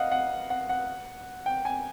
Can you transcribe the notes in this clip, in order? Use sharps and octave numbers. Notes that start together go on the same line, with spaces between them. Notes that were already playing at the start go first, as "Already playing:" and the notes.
Already playing: D#5 F5 F#5
F#5
F#5
F#5
G5
G#5